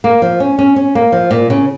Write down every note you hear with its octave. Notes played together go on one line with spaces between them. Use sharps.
A#3
F3
C#4
C#4
C#4
A#3
F3
A#2
C#3